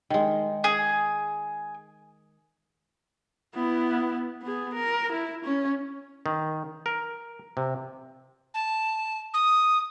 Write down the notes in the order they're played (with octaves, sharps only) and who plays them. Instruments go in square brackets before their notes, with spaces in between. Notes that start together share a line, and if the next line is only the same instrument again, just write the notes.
[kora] D#3 G#3
[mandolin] G#4
[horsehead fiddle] B3 E4
B3 G#4
A#4
E4
C#4
[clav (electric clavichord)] D#3
A#4
C3
[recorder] A5
D#6